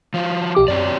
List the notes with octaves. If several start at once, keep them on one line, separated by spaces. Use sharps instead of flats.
F3 F4 F#4
B1 G4 D6
F#2 F#3 C4 D5